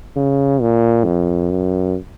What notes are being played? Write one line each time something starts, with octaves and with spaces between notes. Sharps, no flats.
C#3
A#2
F2
F#2